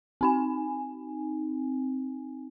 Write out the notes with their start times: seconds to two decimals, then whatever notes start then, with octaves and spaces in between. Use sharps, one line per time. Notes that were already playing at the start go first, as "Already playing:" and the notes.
0.21 C4 D#4 G#5